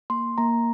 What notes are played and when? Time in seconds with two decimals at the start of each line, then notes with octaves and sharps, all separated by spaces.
0.10 A#3 C6
0.38 A#3 A#5